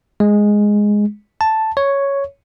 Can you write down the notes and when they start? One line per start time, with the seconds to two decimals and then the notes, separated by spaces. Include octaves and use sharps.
0.20 G#3
1.41 A5
1.77 C#5